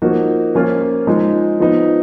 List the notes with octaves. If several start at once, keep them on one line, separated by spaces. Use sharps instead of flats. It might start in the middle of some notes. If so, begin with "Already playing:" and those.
F3 A#3 D#4 F#4
F3 A#3 C#4 F4
F3 G#3 D#4
F3 B3 D#4